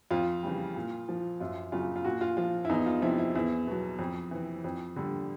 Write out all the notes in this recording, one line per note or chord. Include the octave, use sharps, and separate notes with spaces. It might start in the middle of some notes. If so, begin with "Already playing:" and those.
F2 F4
C#3 E3 G3
A#2
F3
F#2 F4
C#3 F#3 F4
F4
A#2 F#4
F4
F3 F4
E4
E2 D#4
F4
C3 F3 E4
E4
E2 E4
B2 F#3
F2
C3 E3
F2
D3 G3